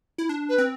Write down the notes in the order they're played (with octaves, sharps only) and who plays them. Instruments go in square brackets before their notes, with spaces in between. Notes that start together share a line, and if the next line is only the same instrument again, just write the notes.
[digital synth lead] E4
D4
[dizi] B4
[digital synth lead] C4